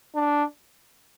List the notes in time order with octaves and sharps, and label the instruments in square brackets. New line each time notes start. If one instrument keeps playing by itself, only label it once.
[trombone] D4